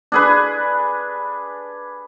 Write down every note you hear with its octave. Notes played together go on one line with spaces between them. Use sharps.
D4 G#4 B4